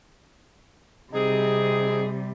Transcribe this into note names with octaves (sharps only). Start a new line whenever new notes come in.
C3 G3 C4 D#4 G#4